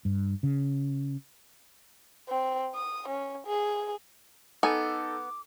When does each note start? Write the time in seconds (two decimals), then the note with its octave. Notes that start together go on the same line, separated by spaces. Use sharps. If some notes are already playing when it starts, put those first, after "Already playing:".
0.05 G2
0.43 C#3
2.29 C4
2.75 D#6
3.09 C#4
3.47 G#4
4.63 B3 D#4 A4 G#5 D6